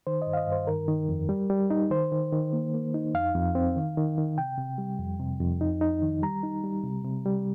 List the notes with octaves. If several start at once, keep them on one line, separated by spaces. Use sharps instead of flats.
D#3 C5
D#5
G2
F5
D#5
G2 C5
D#3 A#4
D#3
F2
G3
G3
D#4
D#3 C5
D#3
D#3
A#3
A#3
D#4
F2 F5
F2
C4
D#3
D#3
D#3
C3 G5
C3
G3
F2
C3
F2
D#4
D#4
D#3
G3 A#5
D#4
G3
C3
C3
G3